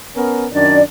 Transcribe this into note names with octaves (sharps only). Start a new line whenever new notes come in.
B3 C#4 A#4
F#2 D#3 D4 D5